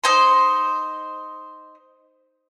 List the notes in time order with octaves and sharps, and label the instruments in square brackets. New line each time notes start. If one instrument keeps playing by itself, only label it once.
[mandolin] D#4 C5 C6